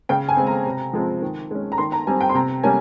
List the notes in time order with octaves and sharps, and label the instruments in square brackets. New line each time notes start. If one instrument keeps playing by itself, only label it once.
[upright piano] C#3 G5
G#5
G#3 C4
A#5
C3
F3 G#3 C4
D#3
G#3 C#4
A#5
D#3 C6
A#5
G3 C4 G#5
G5
C6
C3 A#5
G3 A#3 C#4 G#5